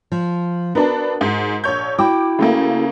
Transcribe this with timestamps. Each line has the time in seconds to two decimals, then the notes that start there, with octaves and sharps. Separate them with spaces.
0.12 F3
0.75 B3 D4 F#4 A#4 A5
1.21 G#2
1.64 A#1 C#5 G6
1.98 E4 F#4 G5 D6
2.39 C#3 A3 A#3